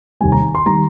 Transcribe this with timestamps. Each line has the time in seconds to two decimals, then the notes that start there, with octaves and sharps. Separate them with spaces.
0.20 F1 D#2 D#3 G3 G#5
0.32 A#5
0.55 C6
0.66 D#3 G3 A#5